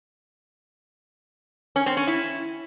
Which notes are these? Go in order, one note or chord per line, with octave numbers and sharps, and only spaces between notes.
C#4
C4
C#4
E4